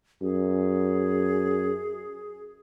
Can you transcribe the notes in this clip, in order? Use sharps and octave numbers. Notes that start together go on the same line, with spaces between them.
F#2 G#4